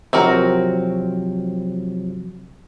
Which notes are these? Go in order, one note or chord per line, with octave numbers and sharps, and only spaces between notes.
C3 F3 F#3 C4 F#4 A#4